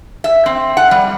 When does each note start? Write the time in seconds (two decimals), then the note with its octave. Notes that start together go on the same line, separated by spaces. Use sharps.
0.24 E5
0.46 C4
0.77 F#5
0.91 G3